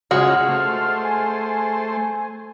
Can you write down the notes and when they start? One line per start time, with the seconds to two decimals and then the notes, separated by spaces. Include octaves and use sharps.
0.11 C#3 G#3 F4 F#4 G#4 F6
0.49 A3 C5
1.04 G#5